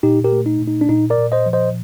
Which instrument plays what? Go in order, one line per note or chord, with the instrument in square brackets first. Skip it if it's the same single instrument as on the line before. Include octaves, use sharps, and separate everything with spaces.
[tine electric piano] A#2 D#4 G4
G4 A#4
A3
D#4
A#2
D#4
D4
A#2 D#4
A#4 D5
A#2
C5 D#5
F3
C5 D#5